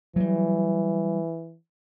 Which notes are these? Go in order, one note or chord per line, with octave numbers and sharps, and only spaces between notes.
E3 F#3 G3